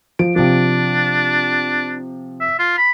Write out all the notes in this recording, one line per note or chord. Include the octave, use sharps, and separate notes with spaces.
F3 D7
C3 F3 D4
E5
F4
B5